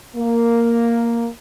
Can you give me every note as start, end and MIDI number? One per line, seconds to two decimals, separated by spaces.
0.16 1.26 58